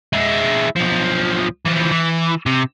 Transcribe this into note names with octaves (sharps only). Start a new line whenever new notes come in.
G#3 E4
B1 F3
E3 F3
E3
C3